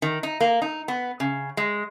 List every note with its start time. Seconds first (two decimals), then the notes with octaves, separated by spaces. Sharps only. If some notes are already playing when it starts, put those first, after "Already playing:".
0.02 D#3
0.23 D#4
0.41 A#3
0.62 D#4
0.88 B3
1.20 C#3
1.57 G#3